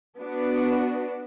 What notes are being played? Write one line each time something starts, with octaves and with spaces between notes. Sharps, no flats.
B3 D4 F#4